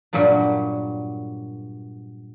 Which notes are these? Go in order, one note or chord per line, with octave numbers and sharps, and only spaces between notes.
G2 A#2 F#3 A#3 D4